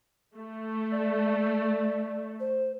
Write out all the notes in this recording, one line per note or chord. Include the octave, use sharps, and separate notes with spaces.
A3
D5
C5